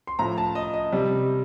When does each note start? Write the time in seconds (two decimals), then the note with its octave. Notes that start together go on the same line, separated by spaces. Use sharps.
0.07 C6
0.19 A2 F3 A#5
0.38 A5
0.55 D#5
0.74 D#5
0.92 C3 G3